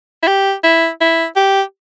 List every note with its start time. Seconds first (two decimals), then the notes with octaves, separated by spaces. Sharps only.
0.23 E4
0.28 G4
0.63 E4
1.01 E4
1.36 G4